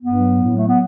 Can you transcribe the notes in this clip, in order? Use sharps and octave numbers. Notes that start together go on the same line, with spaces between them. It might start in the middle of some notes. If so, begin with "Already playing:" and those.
G2 B3
F#3
A2
F#3
A3
B3